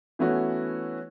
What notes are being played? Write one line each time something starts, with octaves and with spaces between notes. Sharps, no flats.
E3 A3 B3 C#4 E4 F#4